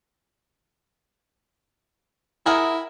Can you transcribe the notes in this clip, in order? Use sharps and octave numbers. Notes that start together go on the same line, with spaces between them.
E4 G#4 A#4 F#5